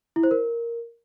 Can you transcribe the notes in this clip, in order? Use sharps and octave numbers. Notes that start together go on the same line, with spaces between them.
E4
C5
A#4